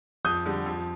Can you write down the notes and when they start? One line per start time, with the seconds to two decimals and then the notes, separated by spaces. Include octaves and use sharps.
0.25 F2 D#6 G6
0.46 D3 G3
0.66 F2